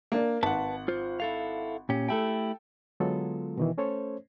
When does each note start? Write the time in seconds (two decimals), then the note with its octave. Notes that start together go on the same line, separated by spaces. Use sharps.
0.12 A#3 D4
0.43 G#1 B4 F#5 A5
0.88 F4 C5
1.20 E4 A4 F5
1.89 A#2 C#4 G4
2.08 A3 E4 G4 A4 G5
3.00 D3 F#3 G#3 B3 F4 A4
3.57 B2 D#3 E3
3.77 A3 C#4 A4 C5 C#5